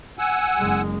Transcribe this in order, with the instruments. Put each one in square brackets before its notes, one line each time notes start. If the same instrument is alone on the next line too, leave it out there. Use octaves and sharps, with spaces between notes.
[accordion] F#5 G#5 E6
[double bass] F#1 G#3